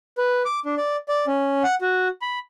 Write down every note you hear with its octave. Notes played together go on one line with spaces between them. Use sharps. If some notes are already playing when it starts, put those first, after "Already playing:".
B4
D6
D4
D5
D5
C#4
F#5
F#4
B5